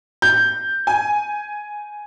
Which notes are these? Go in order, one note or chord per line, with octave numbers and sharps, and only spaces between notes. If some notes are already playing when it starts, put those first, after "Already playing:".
G6
G#5